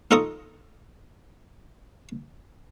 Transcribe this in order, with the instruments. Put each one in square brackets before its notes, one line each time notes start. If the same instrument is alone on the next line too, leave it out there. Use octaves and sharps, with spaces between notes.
[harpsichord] D#4 F4 A4 A#5 C#6 D#6